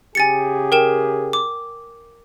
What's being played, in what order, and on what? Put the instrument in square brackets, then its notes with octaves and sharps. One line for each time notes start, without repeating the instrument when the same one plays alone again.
[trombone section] C#3 G4 G#4 [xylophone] G#5 A6 C#7
[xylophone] A#4 G5 E7
D6